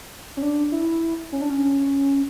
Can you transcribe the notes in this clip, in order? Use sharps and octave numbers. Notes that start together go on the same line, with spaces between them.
C#4
D4
E4
C#4
D4
C#4